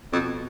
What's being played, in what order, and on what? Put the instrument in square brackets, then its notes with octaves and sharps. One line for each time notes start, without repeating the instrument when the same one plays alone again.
[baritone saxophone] F2 [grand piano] B2